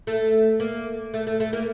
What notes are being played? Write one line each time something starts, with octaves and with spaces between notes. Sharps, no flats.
A3
A#3
A3
A3
A3
A#3